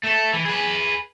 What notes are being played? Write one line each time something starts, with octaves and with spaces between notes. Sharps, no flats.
A3 A4
E3
G#4 B4